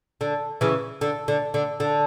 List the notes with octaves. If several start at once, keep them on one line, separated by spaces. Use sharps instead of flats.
D3
C#3 E3
D3
D3
D3
D3